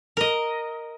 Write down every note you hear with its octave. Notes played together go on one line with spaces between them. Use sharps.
A#4 D#5